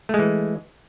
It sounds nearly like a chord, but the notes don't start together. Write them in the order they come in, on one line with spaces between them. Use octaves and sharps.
A3 G#3 E3